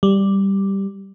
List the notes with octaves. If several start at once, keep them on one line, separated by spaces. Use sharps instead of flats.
G3